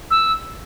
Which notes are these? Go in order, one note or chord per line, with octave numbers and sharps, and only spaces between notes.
E6